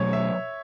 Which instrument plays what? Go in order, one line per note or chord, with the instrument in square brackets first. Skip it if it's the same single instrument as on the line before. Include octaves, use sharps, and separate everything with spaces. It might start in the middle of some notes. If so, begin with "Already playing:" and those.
Already playing: [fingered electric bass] B2 F#3 A3 [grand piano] C#5
[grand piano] E5